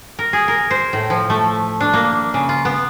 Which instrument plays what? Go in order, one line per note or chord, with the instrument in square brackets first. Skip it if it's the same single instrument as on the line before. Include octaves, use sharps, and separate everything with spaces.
[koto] A#4
G#4
A#4
C5
A2
F3
A3
D4
A#3
C#3
F4
B3